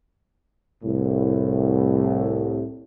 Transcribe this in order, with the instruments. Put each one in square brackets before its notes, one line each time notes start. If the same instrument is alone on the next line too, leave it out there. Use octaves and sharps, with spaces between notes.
[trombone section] C2 A2